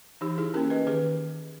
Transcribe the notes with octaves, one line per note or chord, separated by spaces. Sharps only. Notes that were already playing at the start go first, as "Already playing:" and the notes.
E3 D#4 G4
E4 G#4
A#3 C#4 G4 A#4
B4 D#5
D#3 G#4 B4